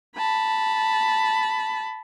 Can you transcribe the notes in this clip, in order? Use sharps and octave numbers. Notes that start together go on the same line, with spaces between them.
A5 B5